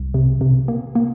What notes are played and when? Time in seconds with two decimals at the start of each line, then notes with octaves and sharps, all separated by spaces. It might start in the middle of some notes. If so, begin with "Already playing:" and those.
Already playing: C2
0.14 C3
0.41 C3
0.68 A#3
0.95 A#3